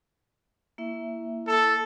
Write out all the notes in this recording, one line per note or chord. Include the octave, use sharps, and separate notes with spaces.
A#3 E4 E5
A4